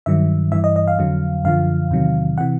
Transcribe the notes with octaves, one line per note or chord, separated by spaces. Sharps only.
G2 D#3 F#3 E5
G2 E3 E5
D#5
D#5
F5
F2 D3 F#3
F#2 D3 F3 F5
E2 C3 D#3 F#3
C3 E3 F#5